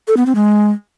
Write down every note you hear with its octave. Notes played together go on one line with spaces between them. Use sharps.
A4
B3
C4
G#3